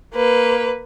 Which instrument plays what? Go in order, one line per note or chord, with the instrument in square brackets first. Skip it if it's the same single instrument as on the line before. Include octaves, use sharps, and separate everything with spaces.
[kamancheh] A#3 B4